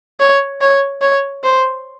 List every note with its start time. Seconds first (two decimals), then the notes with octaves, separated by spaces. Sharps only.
0.20 C#5
0.61 C#5
1.02 C#5
1.44 C5